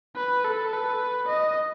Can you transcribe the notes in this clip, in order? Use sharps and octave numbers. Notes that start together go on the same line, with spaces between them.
B4
A4
B4
D#5